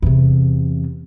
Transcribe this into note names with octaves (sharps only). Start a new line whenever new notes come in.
E2 C3